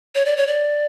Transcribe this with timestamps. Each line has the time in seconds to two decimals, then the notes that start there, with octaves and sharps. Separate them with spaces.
0.15 C#5
0.25 D5
0.37 C#5
0.47 D5